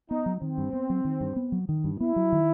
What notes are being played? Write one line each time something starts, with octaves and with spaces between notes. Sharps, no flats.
B3 D#4
F#3
D#3 C4
G2
B3
F#3
D#3
G2
B3
F#3
D#3
G2
B3 E4
F#3
D#3